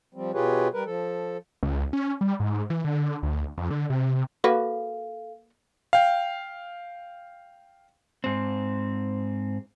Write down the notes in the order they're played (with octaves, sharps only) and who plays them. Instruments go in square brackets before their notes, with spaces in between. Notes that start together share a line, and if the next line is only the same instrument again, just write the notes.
[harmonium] F3 G3 C4
B2 F4 G4 G#4 B4 C#5
G3 A#4 B4
F3 A4
[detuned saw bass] C#2
C#4
G3
G#2
E3
D3
D2
F2
D3
C3
[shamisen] A#3 F#4 B4 [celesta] A4 F5
[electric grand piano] F5 G5
[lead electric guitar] G#2 C4